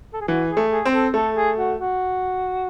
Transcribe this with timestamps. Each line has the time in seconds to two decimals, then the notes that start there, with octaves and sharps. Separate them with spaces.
0.14 A4
0.21 G#4
0.28 E3 F#4
0.49 G#4
0.57 A3
0.71 G#4
0.85 C4
0.93 A4
1.14 A3 A4
1.36 G#4
1.57 F#4
1.78 F#4